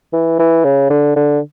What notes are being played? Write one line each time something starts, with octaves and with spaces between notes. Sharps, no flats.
E3
E3
C#3
D3
D3